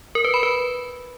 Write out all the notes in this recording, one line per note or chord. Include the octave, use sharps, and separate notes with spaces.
A#4
B4
B5
B4